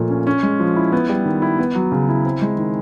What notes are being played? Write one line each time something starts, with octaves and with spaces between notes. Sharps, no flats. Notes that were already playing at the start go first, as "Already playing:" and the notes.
Already playing: A#2 F3 A3
C#4
C#4
G#3
F3
E4
B3
G3
D#3
E4
B3
F#3
C#3
E4
C4
G#3
D#3